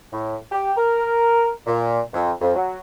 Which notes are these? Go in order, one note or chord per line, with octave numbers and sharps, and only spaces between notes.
A2
G4
A#4
A#2
F2
F2
F#3